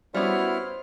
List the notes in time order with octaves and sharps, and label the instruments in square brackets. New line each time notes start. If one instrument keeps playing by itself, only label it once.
[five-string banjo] G3 C#4 [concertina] B3 E4 F6 [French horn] F#4 [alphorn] C5